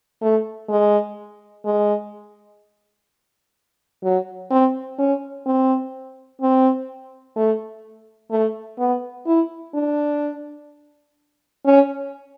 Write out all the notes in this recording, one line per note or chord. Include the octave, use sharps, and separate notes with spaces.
A3
G#3
G#3
F#3
C4
C#4
C4
C4
A3
A3
B3
E4
D4
C#4